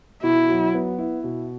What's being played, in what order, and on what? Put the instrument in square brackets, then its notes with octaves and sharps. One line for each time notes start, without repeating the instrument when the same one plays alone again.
[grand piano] B2 [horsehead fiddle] E4
[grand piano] F#3
B3
E4
B2